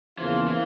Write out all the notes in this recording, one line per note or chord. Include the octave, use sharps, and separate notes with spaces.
E2 C#3 E3 F3 A#3 F4
E3